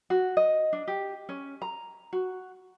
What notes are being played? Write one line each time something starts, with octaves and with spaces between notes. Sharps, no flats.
F#4
D#5
D4
G4
C#4
A#5
F#4